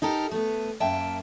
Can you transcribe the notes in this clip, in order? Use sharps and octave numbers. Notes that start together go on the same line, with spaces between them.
D#4 G4 A4 A#4
A3 B3
F#2 A#3 E5 G5 A5